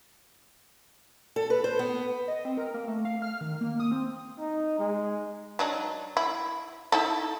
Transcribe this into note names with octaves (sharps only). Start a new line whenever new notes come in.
A4
B4
C5
B3
D#5
C4
A#4
A#3
A3
F5
F6
D#3
A#3
D#6
C4
D#4
G#3
F#3 D4 D#4
E4
D#4 E4 A4